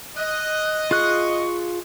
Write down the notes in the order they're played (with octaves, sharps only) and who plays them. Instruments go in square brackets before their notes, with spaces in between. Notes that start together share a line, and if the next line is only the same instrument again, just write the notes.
[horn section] D#5 [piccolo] F#6
[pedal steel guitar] F4 G#4 F#6 [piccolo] C#6